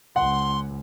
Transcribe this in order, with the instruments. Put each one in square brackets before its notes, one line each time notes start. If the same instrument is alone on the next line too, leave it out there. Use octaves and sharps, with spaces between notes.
[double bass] C#2 [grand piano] F#5 [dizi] C6